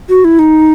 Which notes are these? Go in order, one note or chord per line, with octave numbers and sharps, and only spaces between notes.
F#4
E4
D#4